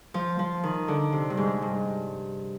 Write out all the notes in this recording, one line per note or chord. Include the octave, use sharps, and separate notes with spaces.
F3
F3
D#3
D3
C3
G2
G#2
G2